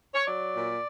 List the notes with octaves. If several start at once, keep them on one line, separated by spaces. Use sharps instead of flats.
C#5
F#3 D5
A#2